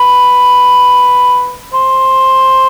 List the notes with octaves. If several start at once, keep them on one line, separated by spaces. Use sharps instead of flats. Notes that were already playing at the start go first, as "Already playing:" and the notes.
Already playing: B4
C5